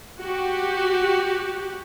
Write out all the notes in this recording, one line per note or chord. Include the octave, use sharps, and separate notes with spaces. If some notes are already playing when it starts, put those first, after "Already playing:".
F#4 G4